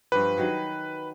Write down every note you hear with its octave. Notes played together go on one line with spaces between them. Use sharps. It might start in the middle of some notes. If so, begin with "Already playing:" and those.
G2 F3 G4 B4
D#3 F#3 G#4